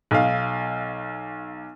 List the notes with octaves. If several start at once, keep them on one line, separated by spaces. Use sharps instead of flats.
B1 F5